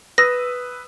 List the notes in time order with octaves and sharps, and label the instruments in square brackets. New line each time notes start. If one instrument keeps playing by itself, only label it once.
[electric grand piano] B4 D#6 E6 [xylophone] A#6